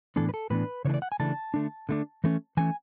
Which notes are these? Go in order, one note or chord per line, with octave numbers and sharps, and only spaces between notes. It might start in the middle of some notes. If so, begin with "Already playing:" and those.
A2 E3 B3 D4 A4
B4
A4
A2 E3 B3 D4 B4
C#3 E3 A3 D4 C#5
D5
F#5
G#5
C#3 E3 A3 D4 A5
D3 A3 D4
D3 A3 D4
E3 A3 C#4
E3 A3 C#4 G#5